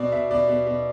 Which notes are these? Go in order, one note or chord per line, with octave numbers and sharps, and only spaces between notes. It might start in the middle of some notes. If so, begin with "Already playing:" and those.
Already playing: B2 D5
B2 E5
B2 D5
B2
B2